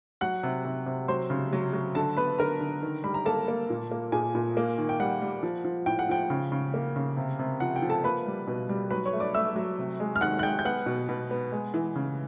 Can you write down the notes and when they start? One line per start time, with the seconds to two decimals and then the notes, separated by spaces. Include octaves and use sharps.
0.21 F#3 F#5 F#6
0.43 C3
0.65 C3
0.86 C3
1.08 F#3 C5 C6
1.30 C#3
1.53 F#3
1.73 F#3
1.95 D3 A4 A5
2.17 B3 B4 B5
2.38 D3 A#4 A#5
2.61 D3
2.82 D#3
3.04 G3 B5
3.14 A#5
3.25 A#3 A4 A5
3.48 A#3
3.70 A#2
3.91 A#3
4.12 A#2 G#4 G#5
4.35 A#2
4.57 A#3
4.78 D#3
4.89 G5
5.00 G3 F#5
5.22 G3
5.43 F3
5.64 F3
5.86 A2 G5
5.99 F#5
6.09 F3 G5
6.30 C#3
6.52 C#3
6.74 A#3
6.96 C#3
7.17 C3
7.39 C3
7.60 F3 F#5
7.76 G5
7.82 F3
7.89 A4 A5
8.04 A#3 B4 B5
8.27 G3
8.47 B2
8.69 G3
8.91 F#3 B4 B5
9.05 C#5 C#6
9.13 A3
9.20 D5 D6
9.34 A3 E5 E6
9.56 F#3
9.78 C3
10.00 G#3
10.16 F6
10.21 D#3 F#5 F#6
10.39 F#6
10.43 G#3 G5 G6
10.59 G6
10.65 B3 F#5 F#6
10.86 B2
11.09 B2
11.31 B3
11.52 G#3
11.74 E3
11.96 C#3